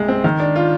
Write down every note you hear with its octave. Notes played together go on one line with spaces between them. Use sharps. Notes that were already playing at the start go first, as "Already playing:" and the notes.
Already playing: C2 G#3
C4
D#3
D4
F4